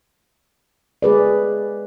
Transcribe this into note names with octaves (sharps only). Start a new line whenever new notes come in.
G#3 G#4 B4 D5